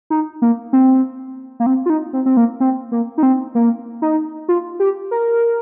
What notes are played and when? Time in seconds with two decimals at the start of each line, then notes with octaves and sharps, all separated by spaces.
0.10 D#4
0.42 A#3
0.73 C4
1.60 A#3
1.66 C4
1.86 F4
1.90 D#4
2.13 C4
2.26 C4
2.37 A#3
2.60 C4
2.92 A#3
3.18 D#4
3.23 C4
3.55 A#3
4.02 D#4
4.49 F4
4.80 G4
5.11 A#4